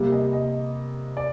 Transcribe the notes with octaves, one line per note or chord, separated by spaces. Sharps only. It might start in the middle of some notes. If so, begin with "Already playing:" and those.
Already playing: C3 G3 A#3
D#5
D#5
D5